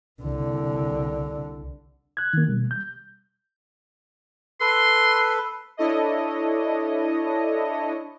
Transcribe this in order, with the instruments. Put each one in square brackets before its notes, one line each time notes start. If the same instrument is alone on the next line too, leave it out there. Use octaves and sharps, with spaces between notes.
[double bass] C2 D3
[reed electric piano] F#6 G#6
D#3 A#3
B2 G3
G6
[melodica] A4 B4 [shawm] C6
[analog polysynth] D4 E4 A4 C#5 D#5